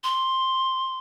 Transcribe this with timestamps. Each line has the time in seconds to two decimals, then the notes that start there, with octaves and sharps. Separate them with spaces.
0.04 C6